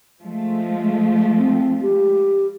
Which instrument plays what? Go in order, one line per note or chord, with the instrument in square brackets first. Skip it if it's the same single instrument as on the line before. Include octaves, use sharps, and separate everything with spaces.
[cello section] F3 G#3 A3
[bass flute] C4
G4